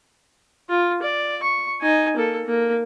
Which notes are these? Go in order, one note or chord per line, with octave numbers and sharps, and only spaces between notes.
F4
D5
C#6
D#4 G#5
A#3 A4
A#3